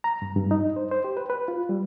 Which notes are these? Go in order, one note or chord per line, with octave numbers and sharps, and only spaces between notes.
A#5
G2
G2
D#4
C5
C5
G4
B4
B4
F4
G3